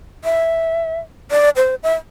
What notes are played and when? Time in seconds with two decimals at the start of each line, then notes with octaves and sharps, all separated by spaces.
0.25 E5
1.31 D5
1.56 C5
1.83 E5